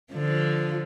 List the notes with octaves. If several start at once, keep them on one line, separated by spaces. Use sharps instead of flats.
D3 F3